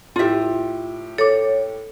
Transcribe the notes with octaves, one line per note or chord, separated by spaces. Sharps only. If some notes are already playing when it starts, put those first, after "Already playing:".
A2 F4 G4 E5
A4 C#5 D6